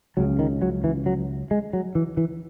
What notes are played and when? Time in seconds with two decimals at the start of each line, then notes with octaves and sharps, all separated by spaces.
0.17 C#2 C#3 F#3
0.39 D#3
0.62 F#3
0.84 E3
1.06 F#3
1.51 G#3
1.73 F#3
1.95 E3
2.17 E3